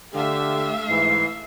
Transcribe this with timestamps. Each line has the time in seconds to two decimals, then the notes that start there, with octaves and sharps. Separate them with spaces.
0.13 D3 A3 G4 E5 F5
0.88 G#2 E3 C7